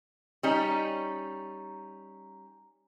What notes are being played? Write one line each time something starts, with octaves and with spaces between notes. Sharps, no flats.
G3 C#4 D#4